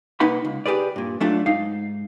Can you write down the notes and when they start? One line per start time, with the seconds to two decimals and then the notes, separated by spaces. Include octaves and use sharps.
0.20 C2 A#3 D#4 B4 F#5 B5
0.45 C#2
0.66 G4 G#4 B4 D5
0.96 G2 A#2
1.20 F#3 A3 D4 F4
1.46 G#2 D#4 F5